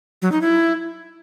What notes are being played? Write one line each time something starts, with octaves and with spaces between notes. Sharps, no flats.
F#3
D#4
E4